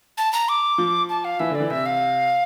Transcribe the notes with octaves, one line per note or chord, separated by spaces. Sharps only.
A5
A#5
D6
F3
A5
F5
E3 E5
D3
D5
E3
C3 E5
F5